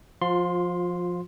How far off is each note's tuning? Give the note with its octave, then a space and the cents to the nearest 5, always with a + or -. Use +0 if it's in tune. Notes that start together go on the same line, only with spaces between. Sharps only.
F3 +10 F4 +30 C6 +0